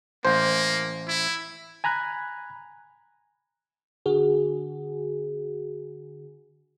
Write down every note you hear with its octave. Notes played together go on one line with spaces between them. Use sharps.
A1 A#3 C5
E4
G#5 A#5 B5 F#6 G#6
D3 F#4 G#4